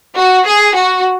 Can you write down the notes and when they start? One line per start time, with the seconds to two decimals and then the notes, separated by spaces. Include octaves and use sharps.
0.17 F#4
0.47 G#4
0.77 F#4